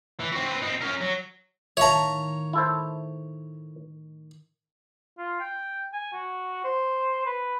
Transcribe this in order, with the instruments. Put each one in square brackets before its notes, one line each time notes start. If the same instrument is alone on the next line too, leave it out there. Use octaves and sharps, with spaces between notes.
[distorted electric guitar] E3
C4 F#4
C4 B4
C4 D#4
C#4 A#4
F#3
[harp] A2 D#3 [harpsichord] C#5 A#5 [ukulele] E5 F5 A5
[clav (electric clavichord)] E4 A4 C5
[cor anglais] F4
G5
G#5
F#4
C5
B4